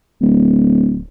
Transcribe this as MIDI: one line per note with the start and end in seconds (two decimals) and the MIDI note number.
0.22 1.04 26